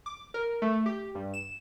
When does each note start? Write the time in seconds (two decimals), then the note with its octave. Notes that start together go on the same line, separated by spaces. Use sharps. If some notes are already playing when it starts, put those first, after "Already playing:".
0.06 D6
0.34 A#4
0.62 A3
0.86 G4
1.15 G2
1.34 E7